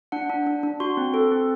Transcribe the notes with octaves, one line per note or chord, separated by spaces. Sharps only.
D4 F#5
D4
D4
D4
F#4 C6
C4
A4
C4